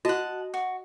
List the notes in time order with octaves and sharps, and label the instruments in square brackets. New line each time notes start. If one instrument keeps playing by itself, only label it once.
[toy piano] F#4 [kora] D#5 [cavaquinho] F#5 A5
[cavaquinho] F#4